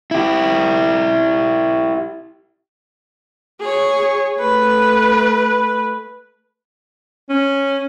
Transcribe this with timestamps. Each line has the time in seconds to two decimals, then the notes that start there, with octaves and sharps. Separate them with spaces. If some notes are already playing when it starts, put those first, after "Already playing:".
0.11 E4 G4
3.61 G#4 C#5
4.39 A3 B4
7.29 C#4